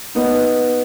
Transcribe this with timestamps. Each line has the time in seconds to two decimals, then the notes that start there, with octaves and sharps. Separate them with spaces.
0.15 B3 D#4